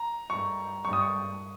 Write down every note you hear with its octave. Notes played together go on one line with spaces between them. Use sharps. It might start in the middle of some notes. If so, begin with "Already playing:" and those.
Already playing: A#5
G2 C#6
G2 C#6
D#6
C#6